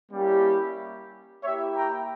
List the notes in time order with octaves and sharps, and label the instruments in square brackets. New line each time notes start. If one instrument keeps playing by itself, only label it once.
[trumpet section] G3 A#3 C#4 E4 G4
A#3 E4 G4 C#5 E5
G5 A#5